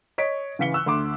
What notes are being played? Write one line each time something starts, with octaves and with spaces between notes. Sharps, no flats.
C#5 D#5 B6 D7
C#3 E3 F5 B6 C#7 G7
C#6 E6 F#6
D2 C6 D6